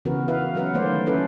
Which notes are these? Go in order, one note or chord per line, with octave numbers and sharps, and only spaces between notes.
C#3 E3 B3 F#4 A#4 B4
E4 B4 E5 F5
F#3 C#4 A#4 B4 F5 F#5
D#3 A3 A#3 C5 D5
A#3 C#4 E4 A4 B4